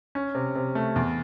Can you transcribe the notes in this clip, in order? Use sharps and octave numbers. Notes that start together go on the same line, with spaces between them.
C#4
C3
C3
A3
E2